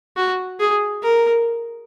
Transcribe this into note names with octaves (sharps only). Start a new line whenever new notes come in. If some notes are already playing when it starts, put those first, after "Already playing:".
F#4
G#4
A#4